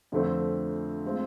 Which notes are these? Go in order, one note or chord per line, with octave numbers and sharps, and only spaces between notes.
F2 D3 F3 A3 C4
G#3 C4 F4